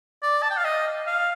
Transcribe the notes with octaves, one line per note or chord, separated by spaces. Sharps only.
D5
A5
G5
F5
D#5
F5